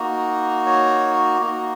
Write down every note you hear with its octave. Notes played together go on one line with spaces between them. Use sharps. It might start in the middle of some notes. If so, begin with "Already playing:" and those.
Already playing: A#3 D#4 F#4
C#5
A#3 D#4 F#4